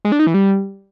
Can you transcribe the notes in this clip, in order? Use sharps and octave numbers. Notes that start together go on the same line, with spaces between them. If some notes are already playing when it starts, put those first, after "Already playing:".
G#3
D4
D#4
E3
G3